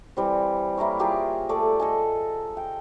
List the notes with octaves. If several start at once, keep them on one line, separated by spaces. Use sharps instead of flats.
E3 G3 C4
A#3 E4 A#4 C#5
F4 G4 G#4 A#4
A3 A4 D5
A4 D#5 G#5
G5